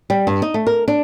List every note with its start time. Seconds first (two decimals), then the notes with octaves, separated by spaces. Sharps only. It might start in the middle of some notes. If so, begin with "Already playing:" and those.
0.10 G3
0.27 G2
0.42 D#4
0.54 A3
0.67 A#4
0.88 D4